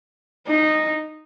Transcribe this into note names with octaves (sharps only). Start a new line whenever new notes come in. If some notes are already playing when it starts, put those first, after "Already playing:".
D#4